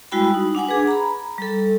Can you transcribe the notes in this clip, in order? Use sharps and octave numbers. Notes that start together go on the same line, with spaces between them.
G3 G#3 E4 F#4 G5 B5
D#4
D4 F#5 G#5 D6
G#4 B4
A#5 B5
G3 A4